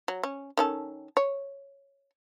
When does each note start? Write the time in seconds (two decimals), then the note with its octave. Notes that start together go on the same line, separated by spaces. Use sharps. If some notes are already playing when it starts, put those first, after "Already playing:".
0.08 F#3
0.23 C#4
0.57 D#3 C#4 A4
1.17 C#5